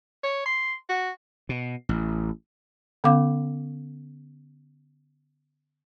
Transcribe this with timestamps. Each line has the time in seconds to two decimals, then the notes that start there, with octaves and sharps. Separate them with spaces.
0.23 C#5
0.46 C6
0.89 F#4
1.49 B2
1.89 A1
3.04 D3 B3 C#4 F5 D6